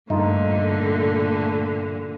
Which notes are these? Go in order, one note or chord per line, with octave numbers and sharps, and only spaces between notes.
G2 A#2 D3 A3 D#4 F4